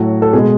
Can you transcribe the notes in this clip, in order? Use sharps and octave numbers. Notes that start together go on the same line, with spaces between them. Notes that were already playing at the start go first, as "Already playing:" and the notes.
Already playing: A2 F#3 A3 F#4
A4
B2 G#3 G#4